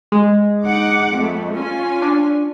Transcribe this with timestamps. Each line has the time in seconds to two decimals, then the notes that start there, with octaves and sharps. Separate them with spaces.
0.12 G#3
0.65 D#4 F#5 D6
1.14 F2 A3
1.56 C#4 F4 G#5
2.02 D4